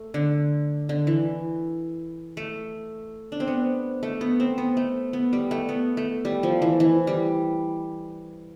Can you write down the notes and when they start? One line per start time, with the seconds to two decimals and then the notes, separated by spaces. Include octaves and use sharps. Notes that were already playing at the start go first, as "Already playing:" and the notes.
Already playing: A3
0.14 D3
0.89 D3
1.07 E3
2.37 A3
3.32 D4
3.40 C4
3.48 B3
4.03 A3
4.21 B3
4.40 C4
4.58 B3
4.77 A3
5.13 B3
5.33 G3
5.51 A3
5.69 B3
5.97 A3
6.25 G3
6.43 F3
6.62 E3
6.80 E3
7.07 G3